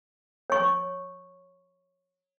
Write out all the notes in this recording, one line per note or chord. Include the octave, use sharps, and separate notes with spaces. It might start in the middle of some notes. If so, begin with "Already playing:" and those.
C#5 C#6